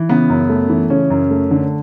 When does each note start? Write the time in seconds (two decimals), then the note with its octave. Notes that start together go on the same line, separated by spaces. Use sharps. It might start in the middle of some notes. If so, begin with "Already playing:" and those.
Already playing: E3
0.09 C#3 B3
0.30 F#2
0.49 A3
0.69 E3
0.90 C#3 C#4
1.10 F#2
1.30 A3
1.51 D3